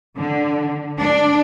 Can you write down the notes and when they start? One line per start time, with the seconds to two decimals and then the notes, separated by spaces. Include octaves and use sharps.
0.17 D3
0.99 D4